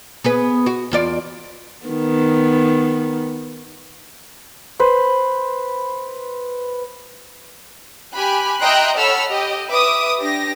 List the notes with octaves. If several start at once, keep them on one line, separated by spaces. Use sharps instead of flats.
B3 G#4 B4
F#4
E2 F4 D5
D#3 B3
B4 C5
G4 G#5 B5 F#6
D#5 E5 G5 A#5 C6 F#6
A4 C#5 F#5 B5 E6 F6
G4 D#5
B4 E5 D6 D#6
D4 G4 A#6